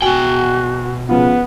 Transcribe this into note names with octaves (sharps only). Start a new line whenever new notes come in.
B2 F#4 G5 G#5 F#7 G7
C#3 F3 B3 F4 B4